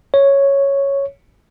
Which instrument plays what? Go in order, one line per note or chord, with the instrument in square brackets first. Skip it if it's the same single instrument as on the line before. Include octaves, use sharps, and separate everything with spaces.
[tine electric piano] C#5